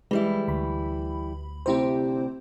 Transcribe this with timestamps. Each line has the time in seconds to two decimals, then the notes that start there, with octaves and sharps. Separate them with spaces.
0.11 E3 G3 G#3 E4
0.48 D2 B5
1.66 D2 C3 C4 E4 G4 C5